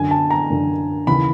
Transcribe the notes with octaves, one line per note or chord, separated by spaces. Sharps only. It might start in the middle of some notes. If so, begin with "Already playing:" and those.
Already playing: F#2 D3 G#5
A5
A#5
F#2 D3
D#2 C#3 E3 B5